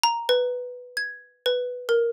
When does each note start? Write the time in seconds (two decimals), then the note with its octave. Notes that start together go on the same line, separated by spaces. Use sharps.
0.03 A#5
0.29 B4
0.97 G#6
1.46 B4
1.89 A#4